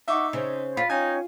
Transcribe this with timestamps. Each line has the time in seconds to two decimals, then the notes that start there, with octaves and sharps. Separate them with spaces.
0.08 D#4 E5 F#5 C#6 D6
0.33 C#3 C5 C#5
0.77 F4 B5
0.90 C#4 D#4 C#5 G5 G#5